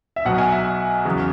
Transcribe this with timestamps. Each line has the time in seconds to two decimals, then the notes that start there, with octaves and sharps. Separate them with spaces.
0.16 E5
0.25 B1 B2 F#3 F#5
0.38 G#5
0.52 E5
1.05 E2 C#3 F#3